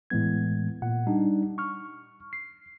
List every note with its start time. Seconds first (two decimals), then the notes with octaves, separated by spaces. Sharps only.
0.10 A2 E3 G#3 B3 G#6
0.82 A#2 F#5
1.07 G3 D4 D#4
1.58 C#6 F6
2.33 C7